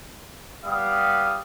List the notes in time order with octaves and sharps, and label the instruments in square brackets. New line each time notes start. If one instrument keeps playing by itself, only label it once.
[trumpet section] G3 B3 F5 D#6